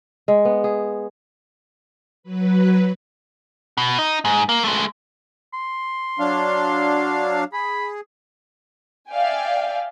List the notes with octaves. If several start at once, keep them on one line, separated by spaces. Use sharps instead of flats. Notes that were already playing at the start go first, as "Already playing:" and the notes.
G#3
B3
G#4
F#3 B4
B2
D#4
G#2
A#3
G#3 A3
C6
F#3 D4 F5
G#4 B5
D5 E5 F5 G5 G#5